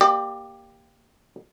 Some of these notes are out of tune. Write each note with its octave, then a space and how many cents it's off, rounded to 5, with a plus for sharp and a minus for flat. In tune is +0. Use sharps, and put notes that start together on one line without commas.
A#3 +0 G4 +5 D5 +40